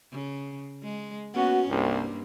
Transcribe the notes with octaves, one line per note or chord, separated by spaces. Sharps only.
C#3
G#3
A#3 B3 C#4 F#4
C2 G2 A#3